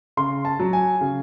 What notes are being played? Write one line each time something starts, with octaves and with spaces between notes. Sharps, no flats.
C#3 C6
A5
F#3
G#5
C#3